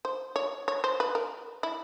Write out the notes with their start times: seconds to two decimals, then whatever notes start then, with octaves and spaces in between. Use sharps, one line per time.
0.05 C5
0.36 C#5
0.68 C#5
0.84 C5
1.00 B4
1.15 A#4
1.63 E4